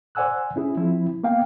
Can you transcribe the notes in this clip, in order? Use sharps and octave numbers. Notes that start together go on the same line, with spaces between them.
C5 D5 F#5 G#5 E6 F#6
C#4 E4 G#4
F3 C4 E4
A#3 B3 F5 G5